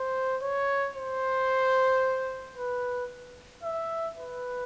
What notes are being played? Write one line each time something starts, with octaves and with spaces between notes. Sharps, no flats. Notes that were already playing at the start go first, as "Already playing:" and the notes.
Already playing: C5
C#5
C5
B4
E5
B4